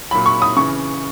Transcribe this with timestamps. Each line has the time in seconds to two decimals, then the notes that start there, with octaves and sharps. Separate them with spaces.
0.11 A#2 F#3 B5
0.26 C#6
0.42 D#6
0.57 C#3 E3 C#6